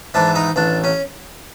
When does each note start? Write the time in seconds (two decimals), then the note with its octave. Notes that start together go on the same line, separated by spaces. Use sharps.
0.14 G#2 E3 D4
0.35 D#4
0.56 A1 D4
0.84 C#4